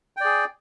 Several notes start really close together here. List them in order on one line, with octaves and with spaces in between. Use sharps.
G5 D5 G#4